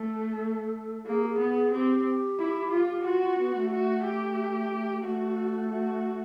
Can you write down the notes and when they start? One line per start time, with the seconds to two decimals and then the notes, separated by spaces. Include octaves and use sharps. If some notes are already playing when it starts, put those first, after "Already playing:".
Already playing: A3 A4
1.07 A#3 G#4
1.22 G4
1.28 G#4
1.39 B3
1.50 G#4
1.72 C4 G4
2.39 E4
2.72 F4
3.05 F4 F#4
3.22 F4
3.39 B3
3.55 A3
3.71 F#4
4.04 G4
5.03 A3 F#4
5.70 F#4